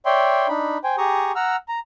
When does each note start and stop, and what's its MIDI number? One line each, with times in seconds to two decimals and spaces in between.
0.06 0.47 73
0.06 0.47 74
0.06 0.47 76
0.06 0.47 79
0.06 0.47 84
0.49 0.78 62
0.49 0.78 63
0.49 0.78 83
0.84 0.96 72
0.84 0.96 79
0.84 0.96 80
0.98 1.32 67
0.98 1.32 68
0.98 1.32 82
0.98 1.32 85
0.98 1.32 87
1.35 1.56 78
1.35 1.56 82
1.35 1.56 88
1.35 1.56 89
1.68 1.79 82